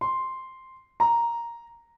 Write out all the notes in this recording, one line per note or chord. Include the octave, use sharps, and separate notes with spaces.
C6
A#5